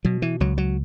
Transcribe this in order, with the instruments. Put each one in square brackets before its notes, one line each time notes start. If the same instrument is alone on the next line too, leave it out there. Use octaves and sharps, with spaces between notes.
[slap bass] B2 F#3
E3
C#2 F#3
F#3